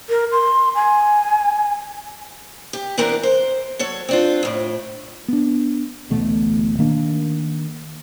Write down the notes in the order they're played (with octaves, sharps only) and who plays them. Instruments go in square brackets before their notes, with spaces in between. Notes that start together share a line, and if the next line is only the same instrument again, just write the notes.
[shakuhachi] A#4
C6
G#5
[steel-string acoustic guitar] G4
E3 B3 C4 D4 A#4
C5
F#3 A4 C#5
C4 D4 F4
F2 A2
[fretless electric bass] B3 D4
D1 A1 B2 A3
D#3 A#3 D4